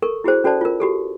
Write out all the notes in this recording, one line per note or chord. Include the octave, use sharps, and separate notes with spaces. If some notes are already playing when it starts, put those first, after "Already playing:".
A4 A#4 C#6
E4 F#4 G#4 C5
C#4 F#4 A4 C5 D5 A5
F4 A#4
F#4 G4 A4